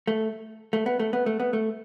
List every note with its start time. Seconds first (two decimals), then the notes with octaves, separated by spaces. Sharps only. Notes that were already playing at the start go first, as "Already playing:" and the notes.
0.07 A3
0.73 A3
0.86 B3
1.00 A3
1.13 B3
1.26 A3
1.40 B3
1.53 A3